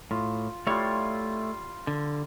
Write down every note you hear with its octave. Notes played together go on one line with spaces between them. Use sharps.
A2 F4
G3 A3 E4 F4 C#5
D3